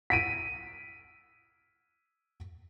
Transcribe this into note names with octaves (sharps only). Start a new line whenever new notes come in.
B6 D7 D#7